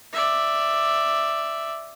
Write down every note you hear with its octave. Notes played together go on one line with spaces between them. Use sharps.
D5 E5